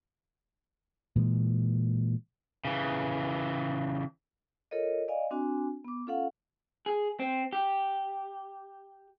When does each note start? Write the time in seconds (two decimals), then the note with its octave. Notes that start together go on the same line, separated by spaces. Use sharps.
1.16 A#2 E3 G#3
2.65 C#3 E3
4.71 F4 A4 A#4 C#5 D#5
5.08 D5 D#5 F5 G#5
5.31 C4 D4 F#4 G#5
5.84 B3 D6
6.07 C#4 F4 A4 F5 F#5
6.86 G#4
7.20 C4
7.53 G4